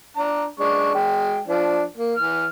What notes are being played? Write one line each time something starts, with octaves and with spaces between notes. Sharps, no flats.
D4 A#5
G#3 D4 C#6
G#3 G5
F3 D4
A#3
E3 F6